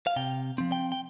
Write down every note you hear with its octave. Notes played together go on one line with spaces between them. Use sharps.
F5
C3 G5
F3 C4
G5
G5